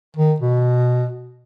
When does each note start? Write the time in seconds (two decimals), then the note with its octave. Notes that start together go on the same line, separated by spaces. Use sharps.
0.17 D#3
0.40 B2